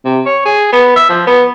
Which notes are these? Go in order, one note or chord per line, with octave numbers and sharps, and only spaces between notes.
C3
C#5
G#4
B3
E5
F3
B3